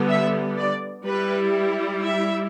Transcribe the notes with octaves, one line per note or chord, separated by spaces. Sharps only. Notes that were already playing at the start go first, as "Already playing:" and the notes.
Already playing: D3 G3 B3
E5
D5
G3 E4 B4
E5